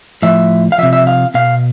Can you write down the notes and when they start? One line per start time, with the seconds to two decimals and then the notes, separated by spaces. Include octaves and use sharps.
0.22 A2 F3 E5
0.72 F5
0.78 C3 F3 E5
0.93 E5
1.07 F5
1.34 B2 F5